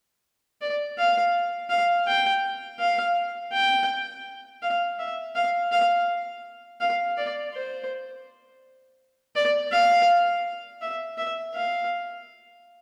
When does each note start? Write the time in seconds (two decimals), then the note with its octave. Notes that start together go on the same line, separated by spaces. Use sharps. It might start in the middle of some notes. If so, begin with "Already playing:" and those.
0.62 D5
0.98 F5
1.70 F5
2.07 G5
2.80 F5
3.53 G5
4.62 F5
4.99 E5
5.35 F5
5.72 F5
6.81 F5
7.17 D5
7.53 C5
9.36 D5
9.72 F5
10.82 E5
11.18 E5
11.54 F5